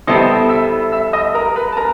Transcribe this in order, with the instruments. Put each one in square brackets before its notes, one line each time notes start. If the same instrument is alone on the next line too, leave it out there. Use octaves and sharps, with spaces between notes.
[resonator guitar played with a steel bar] G3 B3 E4 A4 C5 [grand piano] D#5 D#6
[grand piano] E5 E6
E5 E6
D#5 D#6
A#4 A#5
B4 B5
A5
A#4 A#5